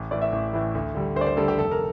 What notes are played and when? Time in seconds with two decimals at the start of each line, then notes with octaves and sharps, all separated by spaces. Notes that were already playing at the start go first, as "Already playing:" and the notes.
Already playing: A1
0.11 A2 E3 D5
0.21 E5
0.32 A1
0.53 A2 E3
0.75 D2
0.95 D3 G3
1.16 D2 C5
1.21 D5
1.26 C5
1.37 D3 G3 A4
1.48 G4
1.58 F1 A4
1.71 A#4